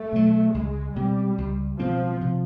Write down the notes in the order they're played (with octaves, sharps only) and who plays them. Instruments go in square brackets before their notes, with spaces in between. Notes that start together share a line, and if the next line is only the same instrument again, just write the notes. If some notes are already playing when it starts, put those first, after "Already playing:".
Already playing: [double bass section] A3
[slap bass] B2 F#3
[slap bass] C#2 [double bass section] G#3
[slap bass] B2 G#3 C4 [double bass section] G3
[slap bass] C#2
[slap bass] B2 G#3 C4 [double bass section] F3
[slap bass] C3